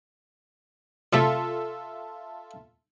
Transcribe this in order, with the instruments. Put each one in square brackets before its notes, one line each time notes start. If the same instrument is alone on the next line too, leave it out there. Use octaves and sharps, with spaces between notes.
[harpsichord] F#2 C3 A3 [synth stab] F4 A4 E5